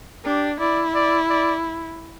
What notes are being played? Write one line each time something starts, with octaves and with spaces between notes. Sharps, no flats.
D4 G4
E4 D5
D5
D5